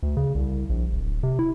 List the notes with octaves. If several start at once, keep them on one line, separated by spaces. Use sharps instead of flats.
D2
C#3
C2
A#1
D1
C3
E4